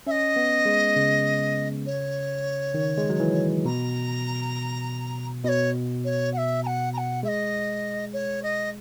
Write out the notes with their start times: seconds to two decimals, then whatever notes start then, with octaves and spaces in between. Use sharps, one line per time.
0.06 C#4 D#5 E5
0.36 B3
0.66 G#3
0.96 C#3
1.86 C#5
2.74 D#3
2.98 G#3
3.10 F#3
3.20 E3
3.65 B2 A#5
5.43 B2 C#5 D#5
6.04 C#5
6.33 F#5
6.37 E5
6.63 A#5
6.66 F#5
6.93 A#5
6.97 F#5
7.23 G#3 E5
7.28 D#5
8.13 C#5
8.42 D#5